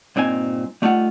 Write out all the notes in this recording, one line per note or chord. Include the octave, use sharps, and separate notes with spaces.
G2 A#2 C4 D#4 G#5
G3 A3 D#4 F4 F#5